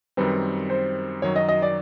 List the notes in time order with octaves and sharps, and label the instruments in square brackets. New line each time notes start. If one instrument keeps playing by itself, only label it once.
[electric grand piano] F#2 D#3 G3 C4 [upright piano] B4
[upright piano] C5
[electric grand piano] F#2 D#3 F#3 [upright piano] C#5
[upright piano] D#5
D#5
D5